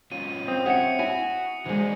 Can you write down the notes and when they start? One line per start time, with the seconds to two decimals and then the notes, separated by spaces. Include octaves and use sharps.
0.12 F#3 C#4 F4 D#7
0.48 C4 D#6
0.66 C#5 E5 F#5 D#6 C#7
0.99 E4 F#4 G#5
1.66 C3 E3 F#3 G#3 D4